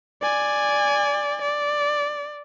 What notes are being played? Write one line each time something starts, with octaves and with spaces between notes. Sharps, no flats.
D5 G#5
D5